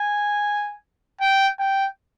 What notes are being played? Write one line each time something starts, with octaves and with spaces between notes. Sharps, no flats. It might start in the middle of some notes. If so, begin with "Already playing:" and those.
Already playing: G#5
G5
G5